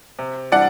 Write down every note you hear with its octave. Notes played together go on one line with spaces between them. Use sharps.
C3
E3 G3 D4 D5 F#5